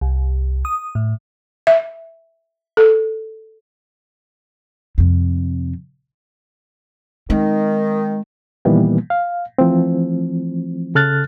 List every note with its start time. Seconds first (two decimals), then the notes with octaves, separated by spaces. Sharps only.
0.01 C2
0.65 D#6
0.95 A2
1.67 E5
2.77 A4
4.98 F2 C3
7.30 D#3 G#3 C4
8.65 A#2 D#3 E3 G3 A#3 B3
9.10 F5
9.58 E3 F3 A3 C4
10.95 C#3 A4 F6 F#6 A6